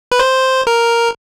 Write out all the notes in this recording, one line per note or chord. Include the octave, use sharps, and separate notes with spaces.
B4
C5
A#4